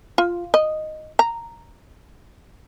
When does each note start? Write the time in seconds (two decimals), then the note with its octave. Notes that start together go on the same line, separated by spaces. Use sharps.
0.18 F4
0.54 D#5
1.19 A#5